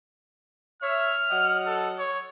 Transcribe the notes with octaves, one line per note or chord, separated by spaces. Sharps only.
C#5 E5 F6
F#3 D#5 F#5
A4
C#5